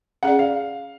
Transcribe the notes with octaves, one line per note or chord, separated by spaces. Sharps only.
C#4 G#4 D5 F#5
F5